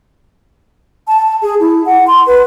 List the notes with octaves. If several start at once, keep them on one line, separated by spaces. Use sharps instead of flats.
A5
G#4
E4
F#5
C6
B4